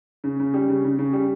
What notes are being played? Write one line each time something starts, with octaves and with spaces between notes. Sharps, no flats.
C#3
C#3
G3
C#3
C#3
C#3
G3